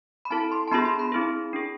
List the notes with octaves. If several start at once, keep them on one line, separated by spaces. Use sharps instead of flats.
B5
C4 E4 A4 A5
C6
A5
B3 D4 F4 G#4 B5
C6
B5
C4 E4 G#4
D4 G#4